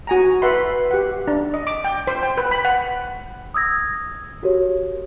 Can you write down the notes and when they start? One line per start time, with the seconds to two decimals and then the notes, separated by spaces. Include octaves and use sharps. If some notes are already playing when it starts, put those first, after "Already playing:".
0.07 F#4 G#5 A#5
0.42 B4 E5 F#5 B5 C6
0.91 G4 F#5
1.27 D4
1.54 D#5
1.67 D6
1.84 G5
2.07 C5
2.23 G5
2.38 B4
2.51 B5
2.65 F#5
3.54 D#6 E6 G#6 A#6
4.43 F#4 G4 A#4 C#5